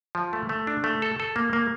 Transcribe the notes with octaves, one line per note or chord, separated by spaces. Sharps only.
F3
A3
A3
D4
A3
A4
A4
A#3
A#3